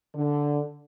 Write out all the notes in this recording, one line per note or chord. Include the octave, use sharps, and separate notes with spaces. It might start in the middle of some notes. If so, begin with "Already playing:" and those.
D3